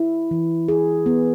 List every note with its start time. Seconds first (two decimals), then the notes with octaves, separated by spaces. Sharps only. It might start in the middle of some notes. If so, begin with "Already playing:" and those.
Already playing: E4
0.31 E3
0.68 G#4
1.06 B3